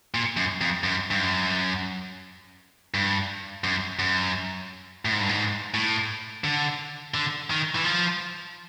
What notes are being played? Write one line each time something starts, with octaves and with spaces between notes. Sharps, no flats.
A#2
F#2
F2
F#2
G2
F#2
G2
F#2
F#2
A2
G#2
G2
G#2
A2
D3
D3
D#3
E3
F3